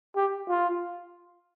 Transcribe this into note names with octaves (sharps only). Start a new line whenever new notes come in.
G4
F4